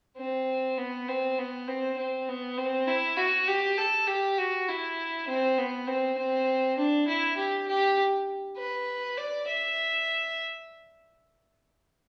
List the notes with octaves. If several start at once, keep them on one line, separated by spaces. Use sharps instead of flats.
C4
B3
C4
B3
C4
C4
B3
C4
E4
F#4
G4
A4
G4
F#4
E4
C4
B3
C4
C4
D4
E4
G4
G4
B4
D5
E5